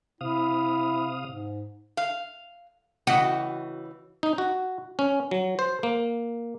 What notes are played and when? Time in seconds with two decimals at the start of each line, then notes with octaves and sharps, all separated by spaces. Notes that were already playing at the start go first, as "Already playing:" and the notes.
0.21 C3 E4 F5 D#6
1.28 G#2
1.97 F5
3.07 C#3 E3 F#4 D#5
4.23 D#4
4.38 F#4
4.99 C#4
5.31 F#3
5.59 C5
5.83 A#3